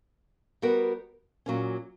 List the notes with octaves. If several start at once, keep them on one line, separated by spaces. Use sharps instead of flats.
G3 B3 F#4 A#4
A#2 F#3 A#3 C#4